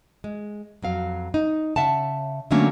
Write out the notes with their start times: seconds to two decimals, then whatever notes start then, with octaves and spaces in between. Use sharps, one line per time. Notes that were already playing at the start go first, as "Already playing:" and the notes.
0.24 G#3
0.82 F2 F#3 F5
1.34 D#4
1.76 C#3 E5 F#5 A5
2.51 D3 F#3 A3 A#3 C#4 D4